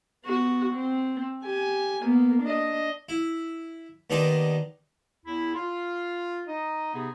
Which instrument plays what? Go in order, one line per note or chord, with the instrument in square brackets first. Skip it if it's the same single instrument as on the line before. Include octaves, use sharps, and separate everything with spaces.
[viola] B3 F#4
C4
G4 G#5
A#3 B3
D4 D#5
[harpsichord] E4
D#2 B3 D4 D#4 D5 C6
[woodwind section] E2 E4
F4
D#4 D#5
C3 B3 D#4 G#4